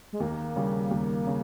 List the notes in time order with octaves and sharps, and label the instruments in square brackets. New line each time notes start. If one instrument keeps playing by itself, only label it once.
[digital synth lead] G#3
[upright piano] D#2 [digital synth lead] A#3
[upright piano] C#3 G3
D#2
C#3